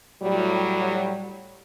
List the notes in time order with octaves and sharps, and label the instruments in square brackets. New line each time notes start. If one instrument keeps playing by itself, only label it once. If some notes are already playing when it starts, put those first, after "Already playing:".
[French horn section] A2 F#3 G3